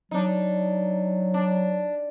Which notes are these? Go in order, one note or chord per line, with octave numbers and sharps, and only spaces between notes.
F#3 D4 D#4
D4